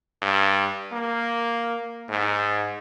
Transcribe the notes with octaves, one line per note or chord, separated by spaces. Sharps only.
G2
A#3
G#2